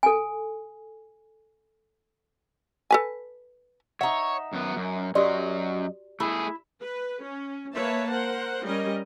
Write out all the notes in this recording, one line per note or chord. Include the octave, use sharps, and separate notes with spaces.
A4 G#5
A4 B4 G#5
D#4 C#5 E5 F#5
F#2 B3
F#2
F#2 F#3 F#4 G4 D5 D#5
A3 E4 G#4
B4
C#4
A#3 B4 C#5 E5 A5
A#4 C5 F#5
G3 C#4 A#4 D#5